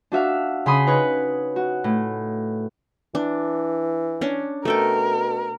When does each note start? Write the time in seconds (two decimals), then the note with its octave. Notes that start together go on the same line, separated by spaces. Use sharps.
0.12 D4 F#4 E5 F5
0.66 C#3 B5 C6 D#6
0.87 D#4 B4 C#5
1.56 F#4
1.84 A2
3.15 E3 D4
4.21 C#4 D4
4.65 B2 A3 A4 A#4 G5